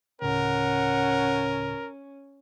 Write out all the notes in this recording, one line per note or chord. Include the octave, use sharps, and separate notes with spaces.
D2 A2 C#3 C#4 A#4 F#5